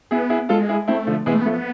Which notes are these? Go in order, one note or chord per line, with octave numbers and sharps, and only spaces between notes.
B3 E4 G#4
E4 G#4
G#3 F4 A4
E4 G#4
A3 C4 E4
D3 F3
E3 G#3 B3
A3
B3
F3 A3
B3